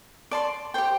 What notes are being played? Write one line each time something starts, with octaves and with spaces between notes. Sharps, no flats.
D5 A5 C6
G4 C5 G5